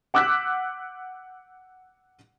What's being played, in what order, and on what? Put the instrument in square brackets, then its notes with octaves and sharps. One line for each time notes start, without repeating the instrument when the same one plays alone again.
[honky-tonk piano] F#5 D6 E6 F#6 G6 B6